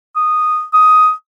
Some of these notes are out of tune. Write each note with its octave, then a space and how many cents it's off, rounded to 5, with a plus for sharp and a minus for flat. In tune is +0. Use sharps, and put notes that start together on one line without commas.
D#6 -10
D#6 +10